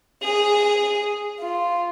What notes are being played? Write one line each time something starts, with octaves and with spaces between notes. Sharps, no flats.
G#4
F4